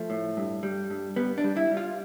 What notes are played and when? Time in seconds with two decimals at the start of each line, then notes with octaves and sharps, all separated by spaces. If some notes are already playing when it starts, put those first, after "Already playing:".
Already playing: F3 A3
0.10 A2
0.37 G2
0.63 G3
0.90 G2
1.16 G3 B3
1.38 D4
1.44 G3
1.57 E4
1.71 G3
1.77 F4